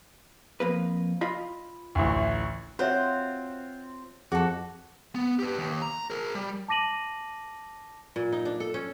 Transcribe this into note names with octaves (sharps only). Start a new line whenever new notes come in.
F2 A#3 B4
F4 D#5 B5
A1 D2
C4 F4 F#4 C5 C#5 E5 F#5
F2 F#4 G#4 A4
B3
G4 B4
D#2
A#5
G#4 A#4
G3
A5 D6 A#6 D#7 F#7
A#2
D#4
D4
A4
C#4